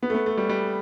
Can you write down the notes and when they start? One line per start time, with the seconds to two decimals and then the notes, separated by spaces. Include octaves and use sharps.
0.03 B3
0.10 A3
0.15 B3
0.26 A3
0.37 G3
0.49 G3